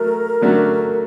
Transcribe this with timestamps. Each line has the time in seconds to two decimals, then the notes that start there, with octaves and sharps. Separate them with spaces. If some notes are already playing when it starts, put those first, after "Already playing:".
Already playing: F#3 A3 F#4 A#4
0.42 D3 F#3 A3 D4 F#4